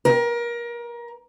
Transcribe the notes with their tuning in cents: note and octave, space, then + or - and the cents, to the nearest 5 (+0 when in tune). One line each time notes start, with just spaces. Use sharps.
A#4 +25